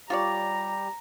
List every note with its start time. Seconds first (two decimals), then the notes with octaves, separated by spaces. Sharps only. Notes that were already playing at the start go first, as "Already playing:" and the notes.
0.10 G3 F4 G4 C#5 D5 A#5